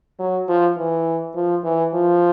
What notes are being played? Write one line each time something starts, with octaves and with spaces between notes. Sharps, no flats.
F#3
F3
E3
F3
E3
F3